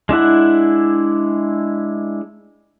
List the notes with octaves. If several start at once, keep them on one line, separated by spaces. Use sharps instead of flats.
G#3 D4 E4 F#5